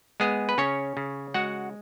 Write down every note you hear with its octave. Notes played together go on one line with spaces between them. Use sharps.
G#3 B3 G#4
B4
C#3 C#4 C#5
C#3
G#3 F#4 F#5